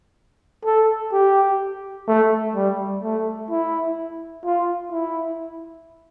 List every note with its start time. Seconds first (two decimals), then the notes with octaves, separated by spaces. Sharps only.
0.65 A4
1.13 G4
2.08 A3
2.56 G3
3.03 A3
3.50 E4
4.45 F4
4.92 E4